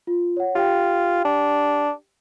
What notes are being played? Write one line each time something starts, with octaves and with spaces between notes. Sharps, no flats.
F4
C#5 F#5
F4 G4 G5
D4